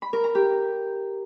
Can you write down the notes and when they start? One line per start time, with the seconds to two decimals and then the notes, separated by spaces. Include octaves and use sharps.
0.02 B5
0.13 A#4
0.24 A#5
0.35 G4